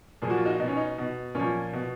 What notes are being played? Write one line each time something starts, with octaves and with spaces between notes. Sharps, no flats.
A#2 F3 G#4
F#4
F4
D#4 F#4
B2 D#4
C#4
D#4
B2
A#2 F3 C#4
B2